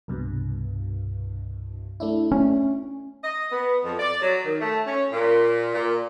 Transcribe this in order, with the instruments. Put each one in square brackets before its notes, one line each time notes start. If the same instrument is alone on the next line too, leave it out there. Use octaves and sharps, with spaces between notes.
[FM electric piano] C2 G2 B2
A3 D4 E4
[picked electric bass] C#4
[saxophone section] D#5
B3
F2
D5
F#3
D#3
A3
C#4
A#2
A#2